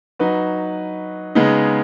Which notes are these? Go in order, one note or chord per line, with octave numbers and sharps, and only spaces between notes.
F#3 D#4 F#4 B4
C#3 G#3 B3 D#4